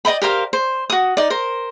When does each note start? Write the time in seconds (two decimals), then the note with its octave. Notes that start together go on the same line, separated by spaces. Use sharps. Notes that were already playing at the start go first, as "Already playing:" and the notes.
0.05 D5 D#5 G5 B5
0.22 G4 A#4 C5 F5
0.53 C5
0.90 F#4 D#6
1.17 D#4 D5
1.30 A#4 C5